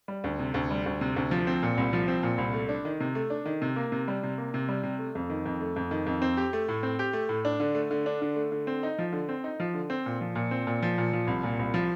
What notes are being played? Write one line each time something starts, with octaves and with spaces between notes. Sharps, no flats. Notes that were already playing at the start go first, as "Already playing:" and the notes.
G3
D2
C3
D2
G3
D2
C3
D2
F3
C4
A#2
C2
F3
C4
A#2
C2
A3
D4
D#3
C3
A3
D4
D#3
C3
A#3
C3
G3
C3
A#3
C3
G3
C3
A3
F2
D#3
F2
A3
F2
D#3
F2
C4
G4
A3
A2
C4
G4
A3
A2
D4
D3
A3
D3
D4
D3
A3
D3
C4
D#4
F3
D3
C4
D#4
F3
D3
C4
A#2
F3
A#2
C4
A#2
F3
A#2
F3
C2
A#2
C2
F3